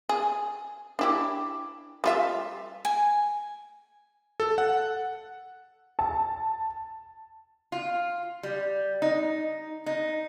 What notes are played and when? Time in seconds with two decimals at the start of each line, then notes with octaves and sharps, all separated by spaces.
0.09 G#4
0.99 D4 E4 G4
2.04 G3 F4 E5
2.85 G#5
4.40 A4
4.58 F#5
5.99 A5
7.72 F4
8.43 G3
9.02 D#4
9.86 D#4